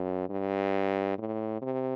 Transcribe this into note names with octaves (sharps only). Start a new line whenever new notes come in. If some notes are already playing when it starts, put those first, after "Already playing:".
Already playing: F#2
G2
A2
C3